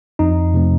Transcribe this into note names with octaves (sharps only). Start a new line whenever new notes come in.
F2 D#4
C3 F3 A3 C4